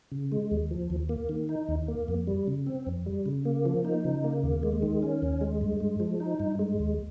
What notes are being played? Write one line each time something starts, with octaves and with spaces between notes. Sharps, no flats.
C#3
G#3
D#2
F3
D#2
A#3
D#3
D#4
D#2
A#3
F2
G3
C#3
C4
F2
G3
C#3
A#3
F3
D#4
C#3
A#3
D#2
G#3
D#3
C#4
D#2
G#3
G2
G#3
F3
D#4
G2
G#3
D#2